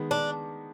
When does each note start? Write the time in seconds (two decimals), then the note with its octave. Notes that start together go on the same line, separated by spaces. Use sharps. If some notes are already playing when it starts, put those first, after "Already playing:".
Already playing: D#3 G#3 B3
0.11 D4